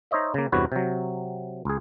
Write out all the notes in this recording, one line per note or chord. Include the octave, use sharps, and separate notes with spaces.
D#4 C5 C#5 D#5 E5
C#3 A#3
E2 G2 C3 F#4 B4 C#5
C3 F#3
C#2 G#4